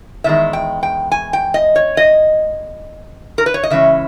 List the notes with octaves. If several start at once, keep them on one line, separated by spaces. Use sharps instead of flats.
E2 D#3 G#3 E5
G5
G5
G#5
G5
D#5
C#5
D#5
A#4
B4
C#5
D#5
C#3 E3 G#3 C#4 E5